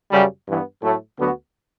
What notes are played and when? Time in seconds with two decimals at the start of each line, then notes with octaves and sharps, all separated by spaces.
0.11 F#2 C#3 G3
0.46 G2 E3 B3
0.81 A2 F#3 A3
1.17 D2 D3 F#3 B3 F#4